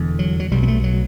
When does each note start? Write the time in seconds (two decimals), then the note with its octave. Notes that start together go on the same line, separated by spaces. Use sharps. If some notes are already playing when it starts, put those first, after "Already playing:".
Already playing: E1 E2 D3
0.19 F#3
0.40 F#3
0.51 B1 B2 G3
0.63 B3
0.68 A3
0.84 F#3